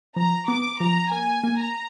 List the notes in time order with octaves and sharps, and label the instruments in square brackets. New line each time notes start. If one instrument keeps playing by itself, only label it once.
[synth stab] F3 [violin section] A#5
[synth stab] B3 [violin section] D6
[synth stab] F3 [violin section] A#5
[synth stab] A#3 [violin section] G#5
[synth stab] A#3
[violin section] A#5